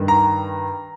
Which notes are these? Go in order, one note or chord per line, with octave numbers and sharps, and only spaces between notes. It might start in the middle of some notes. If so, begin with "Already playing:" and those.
Already playing: G2 D#3
A#5